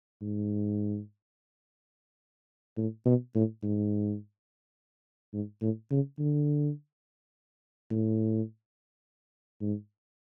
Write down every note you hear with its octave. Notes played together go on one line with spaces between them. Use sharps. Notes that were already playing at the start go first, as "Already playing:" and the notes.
G#2
A2
B2
A2
G#2
G#2
A2
C#3
D3
A2
G#2